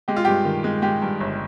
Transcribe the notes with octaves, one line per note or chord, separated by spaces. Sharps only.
G#3 G4
F4
G2 G4
D#3
G#3
G#3 G4
G2
G1